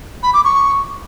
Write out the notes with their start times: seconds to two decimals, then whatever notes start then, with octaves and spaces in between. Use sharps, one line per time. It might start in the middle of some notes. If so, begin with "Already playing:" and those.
0.23 B5
0.34 D6
0.45 C#6